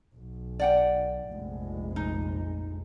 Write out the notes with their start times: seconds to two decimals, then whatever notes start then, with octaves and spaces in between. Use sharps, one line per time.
0.16 B1
0.60 D5 F#5 G5
1.29 F1 A#1 G#3
1.96 D#4